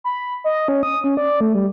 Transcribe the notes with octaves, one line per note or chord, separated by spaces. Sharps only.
B5
D#5
C#4
D#6
C#4
D5
A3
G3